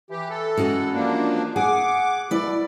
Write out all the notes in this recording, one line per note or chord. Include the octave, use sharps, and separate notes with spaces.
E3 G4
A4
G#3 C#4 F#4
F3 A#3 D4
G#4 F#5 D6
B2 G3 E4 D5